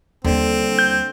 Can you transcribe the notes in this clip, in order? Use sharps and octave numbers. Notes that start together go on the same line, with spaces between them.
D#2 D3 G3 C4
G6